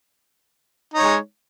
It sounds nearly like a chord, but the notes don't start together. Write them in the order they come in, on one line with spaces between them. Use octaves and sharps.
D#4 C#5 G#3